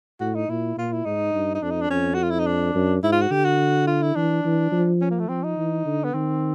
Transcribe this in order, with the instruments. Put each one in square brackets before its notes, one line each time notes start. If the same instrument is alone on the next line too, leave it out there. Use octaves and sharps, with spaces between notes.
[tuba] A2 [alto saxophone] F#4
[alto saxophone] D#4
[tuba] A#2 [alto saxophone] E4
[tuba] A#2 [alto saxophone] F4
[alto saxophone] E4
[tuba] G#2 [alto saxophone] D#4
[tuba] G2
[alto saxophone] D#4
[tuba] F2 [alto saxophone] D4
[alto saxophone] D#4
D4
[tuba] F2 [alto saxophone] C#4
[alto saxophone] F#4
F4
E4
D#4
D4
[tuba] F#2
[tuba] G#2 [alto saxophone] E4
[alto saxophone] F4
F#4
[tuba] D3 [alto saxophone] G4
[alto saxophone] F#4
F4
E4
[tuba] E3 [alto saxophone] D4
[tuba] E3
F3
[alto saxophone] C#4
A#3
A3
[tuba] F3 [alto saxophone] C4
[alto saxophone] D#4
[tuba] E3
D3
[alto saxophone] B3
[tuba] D#3 [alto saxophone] C4